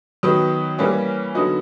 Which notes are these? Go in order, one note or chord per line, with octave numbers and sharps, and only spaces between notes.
D#3 F#3 B3
E3 G3 A#3 C#4
D3 F#3 B3 D#4 F#4